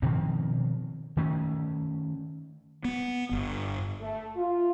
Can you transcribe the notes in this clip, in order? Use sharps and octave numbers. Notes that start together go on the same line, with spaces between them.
B2 D#3 F3 C4
D#3 A3 C#4
B3
G1
A3
F4